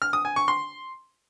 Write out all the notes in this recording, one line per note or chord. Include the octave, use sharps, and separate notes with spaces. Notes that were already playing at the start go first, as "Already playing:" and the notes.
F6
D#6
G#5
C#6
C6